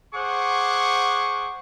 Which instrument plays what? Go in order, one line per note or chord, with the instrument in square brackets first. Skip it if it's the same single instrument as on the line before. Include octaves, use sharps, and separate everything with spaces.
[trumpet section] G#4 C5 F#5 C#6 D6